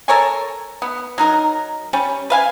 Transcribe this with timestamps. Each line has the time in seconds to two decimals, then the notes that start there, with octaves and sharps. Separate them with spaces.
0.08 A4 A#4 C#5 G#5
0.82 B3
1.18 F#3 D#4 A#4
1.93 G3 C#4
2.30 B4 F5 G#5